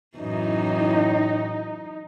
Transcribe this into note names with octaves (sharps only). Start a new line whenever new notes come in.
F#2 A2 E3 D#4